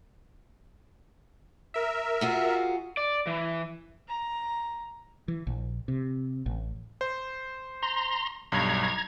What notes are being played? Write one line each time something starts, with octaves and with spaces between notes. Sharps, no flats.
A#4 E5
F4 F#4 G#4
D5
E3
A#5
E3
A#1
C3
A1
C5
A#5 C6
B1 G2 A#5 G#6